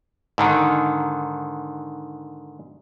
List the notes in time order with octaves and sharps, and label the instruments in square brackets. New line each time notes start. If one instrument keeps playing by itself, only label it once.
[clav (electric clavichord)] G#2 D3 D#3